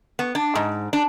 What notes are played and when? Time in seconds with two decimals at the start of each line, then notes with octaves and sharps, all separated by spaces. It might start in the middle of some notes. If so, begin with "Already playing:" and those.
0.19 B3
0.35 D4
0.55 G#2
0.93 D4